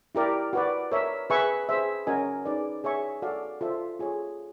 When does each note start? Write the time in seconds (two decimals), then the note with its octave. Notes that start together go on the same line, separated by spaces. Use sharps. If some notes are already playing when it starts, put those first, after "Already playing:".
0.15 E4 G4 A#4 D5
0.53 F#4 B4 D5
0.92 A#4 C#5 E5
1.30 G#4 B4 E5 G#5 C#6
1.69 G#4 C5 E5
2.07 C#4 F#4 A#4 D#5 G#5
2.46 D#4 G#4 B4 D5
2.84 G#4 C#5 E5 G#5 C#6
3.22 F#4 A4 D5 F5
3.61 F4 A4 C5 E5
3.99 F4 G#4 C#5